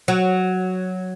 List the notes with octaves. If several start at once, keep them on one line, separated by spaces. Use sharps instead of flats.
F#3